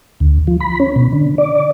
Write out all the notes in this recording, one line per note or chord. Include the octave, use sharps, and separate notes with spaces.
D2
F3
B5
C#4
B2
D3
D5